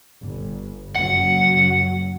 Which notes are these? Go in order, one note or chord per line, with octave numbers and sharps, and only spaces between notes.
G1
F#1 F#3 F#5